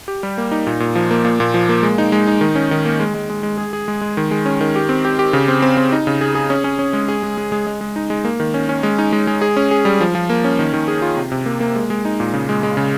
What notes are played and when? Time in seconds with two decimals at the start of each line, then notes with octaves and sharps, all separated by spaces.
0.08 G4
0.23 G3
0.38 A#3
0.51 D#4
0.67 A#2
0.80 A#2
0.95 F3
1.11 A#3
1.25 A#2
1.40 A#2
1.54 F3
1.69 A#3
1.83 G#3
1.98 D#4
2.12 G#3
2.27 D#4
2.41 D#3
2.55 C#4
2.71 D#3
2.86 A#3
3.00 G#3
3.14 G#3
3.30 G#3
3.43 G#3
3.58 G#4
3.73 G#4
3.88 G#3
4.01 G#3
4.17 D#3
4.31 G#3
4.46 C#4
4.61 D#3
4.76 G4
4.89 C4
5.05 G4
5.19 G4
5.33 C#3
5.48 C4
5.62 C4
5.77 C4
5.92 D#4
6.07 C#3
6.21 G#4
6.35 G#4
6.50 C#4
6.64 C#4
6.79 C#4
6.93 G#3
7.08 G#4
7.23 G#3
7.37 G#3
7.52 G#3
7.67 G#3
7.81 G#3
7.96 D#4
8.10 G#3
8.25 A#3
8.40 D#3
8.54 C#4
8.69 C#4
8.83 G#3
8.98 D#4
9.13 G#3
9.27 G#3
9.42 G#4
9.57 C#4
9.71 G#4
9.85 G3
10.00 F3
10.15 F3
10.30 A#3
10.44 C#4
10.59 D#3
10.73 D#3
10.88 G#4
11.02 F4
11.17 C3
11.32 C3
11.46 A#3
11.60 A#3
11.76 G#3
11.90 G#3
12.05 D#4
12.20 A#2
12.33 C#3
12.49 G#3
12.63 G#3
12.77 C#3